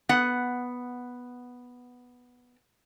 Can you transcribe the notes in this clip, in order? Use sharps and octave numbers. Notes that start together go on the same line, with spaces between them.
B3 F#5